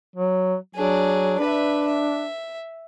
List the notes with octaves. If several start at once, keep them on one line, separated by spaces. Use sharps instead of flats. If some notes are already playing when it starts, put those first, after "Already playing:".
F#3
F#3 D4 G#4
D4 B4 E5
E5